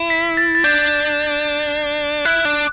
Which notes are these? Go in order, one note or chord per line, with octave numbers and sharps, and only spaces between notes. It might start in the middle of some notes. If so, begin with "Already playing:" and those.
Already playing: E4
B6
A6
A6
D4 G6
E4 F#6
D4